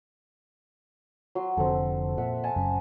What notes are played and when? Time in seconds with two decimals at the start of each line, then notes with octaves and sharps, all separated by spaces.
1.35 F#3 C6
1.57 F1 D3 F3 C4 A4
2.18 A#2 E5 F#5
2.44 G#5 A5
2.56 F#1 F#2 C#3